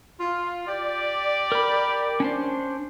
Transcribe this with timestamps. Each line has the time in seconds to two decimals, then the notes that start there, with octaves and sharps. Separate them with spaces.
0.20 F4
0.67 G4 D5
1.52 A#4 B5
2.20 C#4 D4 C5